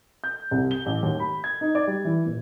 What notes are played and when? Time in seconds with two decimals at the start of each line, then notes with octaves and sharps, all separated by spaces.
0.24 G6
0.51 C2
0.71 G7
0.86 A1
1.03 D#2
1.20 B5
1.44 G#6
1.61 D#4
1.75 D5
1.87 G3
2.05 E3
2.25 D#1